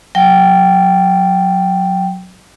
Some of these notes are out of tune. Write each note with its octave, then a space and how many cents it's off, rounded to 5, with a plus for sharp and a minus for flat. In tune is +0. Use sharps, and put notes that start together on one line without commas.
F#3 -15 G5 +0